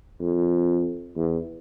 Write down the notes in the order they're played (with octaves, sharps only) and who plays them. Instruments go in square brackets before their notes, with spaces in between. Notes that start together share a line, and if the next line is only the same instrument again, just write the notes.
[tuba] F2
E2